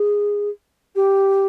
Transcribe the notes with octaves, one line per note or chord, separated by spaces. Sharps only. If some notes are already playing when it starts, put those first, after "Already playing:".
Already playing: G#4
G4